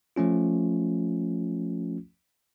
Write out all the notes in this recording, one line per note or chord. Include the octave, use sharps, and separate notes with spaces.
F3 A3 C#4 F4